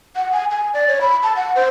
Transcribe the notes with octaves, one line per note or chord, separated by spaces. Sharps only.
F#5
G#5
G#5
D5
C#5
B5
A5
F#5
C5